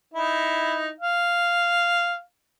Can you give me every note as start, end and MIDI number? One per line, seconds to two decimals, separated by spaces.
0.14 0.91 63
0.14 0.91 64
1.00 2.20 77